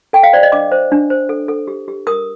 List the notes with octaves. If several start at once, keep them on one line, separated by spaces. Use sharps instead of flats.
A4 G5
F5
C5 D5
D#5
D4 D6
C5
D4
C5
A4
A4
G4
G4
A#4 D#6